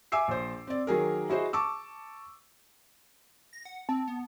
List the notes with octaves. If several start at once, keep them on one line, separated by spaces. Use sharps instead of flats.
E5 G#5 D6 E6 C7
A#1 C5
C4 D5
D#3 F#3 G#4 A#4
E4 F#4 G#4 C5 D#5
A5 C#6 D6 E6
A#6
F#5
C4 A5
B3